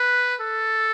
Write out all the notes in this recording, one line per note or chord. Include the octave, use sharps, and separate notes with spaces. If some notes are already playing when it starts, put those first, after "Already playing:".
Already playing: B4
A4